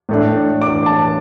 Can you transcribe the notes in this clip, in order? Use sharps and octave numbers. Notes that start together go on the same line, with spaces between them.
A2 A3 D4
D6
A5